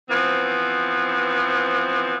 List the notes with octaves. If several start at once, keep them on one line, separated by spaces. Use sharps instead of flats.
E3 F3 B3 C4